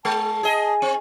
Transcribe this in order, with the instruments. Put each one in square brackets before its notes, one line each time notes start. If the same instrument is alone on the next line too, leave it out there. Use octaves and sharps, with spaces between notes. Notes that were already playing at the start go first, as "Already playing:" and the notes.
[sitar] G#3 [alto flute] A5
[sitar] G#4 D#5
C4